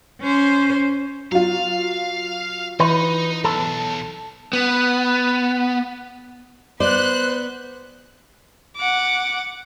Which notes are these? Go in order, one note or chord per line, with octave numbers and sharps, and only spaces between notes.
C#4 C5
F#3 F4 F5
E3 D#4 B4
B1 A4
B3
B3 C5 D5 F#6
F#5 D6